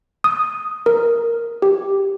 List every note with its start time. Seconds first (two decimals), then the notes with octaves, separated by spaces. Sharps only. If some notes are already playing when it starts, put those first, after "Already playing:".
0.24 D#6
0.86 A#4
1.62 G4